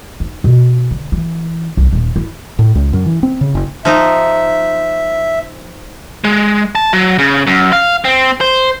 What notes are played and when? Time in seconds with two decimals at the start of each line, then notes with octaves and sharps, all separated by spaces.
0.20 D#4
0.44 B2
0.91 D3
1.12 E3
1.77 C2
1.93 D#1
2.16 E4
2.59 A2
2.75 C#2
2.93 F#2
3.06 E3
3.23 C4
3.41 C#3
3.55 F#1
3.85 F3 D#4 E5
6.24 G#3
6.75 A5
6.93 F#3
7.19 C#3
7.47 F#2
7.73 F5
8.05 C4
8.41 C5